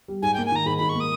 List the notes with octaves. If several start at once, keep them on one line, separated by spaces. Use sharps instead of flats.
G3
G#2 G#5
A#3 G5
G#5
D#3 A#5
G#2 B5
G#2 B5
C#6
A#3 D#6